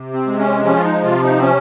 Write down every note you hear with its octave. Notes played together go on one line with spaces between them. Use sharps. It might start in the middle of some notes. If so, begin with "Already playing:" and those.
Already playing: C3
C4
G#3
C#4
F3 C#4
F4
D#4
C3 F4
D#4
C4
C#4